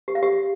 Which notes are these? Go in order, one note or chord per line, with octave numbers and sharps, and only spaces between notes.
G4
F5
G4